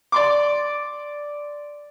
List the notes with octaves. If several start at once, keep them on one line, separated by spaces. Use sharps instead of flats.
D5 C6 D6